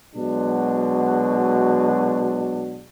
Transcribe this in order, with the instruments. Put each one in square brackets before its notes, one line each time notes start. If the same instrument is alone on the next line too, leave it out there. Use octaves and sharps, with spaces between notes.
[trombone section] B2 F#3 G#3 D4 F#4